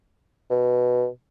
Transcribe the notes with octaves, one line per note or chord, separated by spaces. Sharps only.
B2